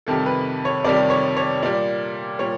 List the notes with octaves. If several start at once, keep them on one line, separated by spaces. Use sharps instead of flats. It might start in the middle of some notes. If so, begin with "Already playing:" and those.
F2 C3 D#3 G3 A4
B4
C#5
F2 C3 D#3 G3 D5
C#5
C#5
A#2 G3 D5
A#2 G3 C#5